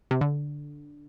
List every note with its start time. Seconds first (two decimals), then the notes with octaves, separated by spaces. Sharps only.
0.11 C3
0.21 D3